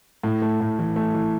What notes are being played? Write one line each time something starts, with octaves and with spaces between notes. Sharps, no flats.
A2
A3
A2
E3
A3
E3